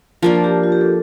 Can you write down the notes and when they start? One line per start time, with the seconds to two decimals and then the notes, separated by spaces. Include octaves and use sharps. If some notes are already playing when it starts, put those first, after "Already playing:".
0.22 F3 A#3 D4 A#4
0.44 G4
0.63 F4
0.72 G4
0.81 A4